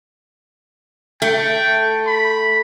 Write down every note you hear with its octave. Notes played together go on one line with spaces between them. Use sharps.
A3 G5
B5